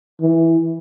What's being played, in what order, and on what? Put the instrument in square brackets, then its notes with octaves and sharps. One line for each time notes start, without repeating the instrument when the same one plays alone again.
[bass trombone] E3